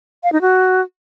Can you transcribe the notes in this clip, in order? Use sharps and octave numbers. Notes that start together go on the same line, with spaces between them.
F5
D#4
F#4